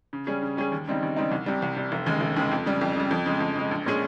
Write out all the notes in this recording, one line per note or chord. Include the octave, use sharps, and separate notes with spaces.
C#3
G3 C#4 G#4
C#3
G3 C#4 G#4
D#2
C#3 G3 C4 D#4
D#2
C#3 G3 C4 D#4
C2
C3 G3
C2
C3 G3
F1
D#2 C#3 G#3
F1
D#2 C#3 G#3
F2
C#3 G3
F2
C#3 G3
F2
C#3 G#3
F2
C#3 G#3
A#1
A#2 G#3 C#4 G#4